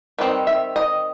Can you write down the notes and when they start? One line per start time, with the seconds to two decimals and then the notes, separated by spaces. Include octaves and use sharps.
0.19 D#3 G3 C4 D#4 B4
0.47 E5
0.76 D#5